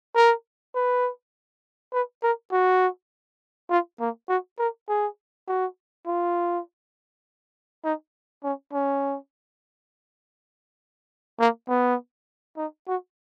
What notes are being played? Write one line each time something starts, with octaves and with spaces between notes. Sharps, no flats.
A#4
B4
B4
A#4
F#4
F4
A#3
F#4
A#4
G#4
F#4
F4
D#4
C#4
C#4
A#3
B3
D#4
F#4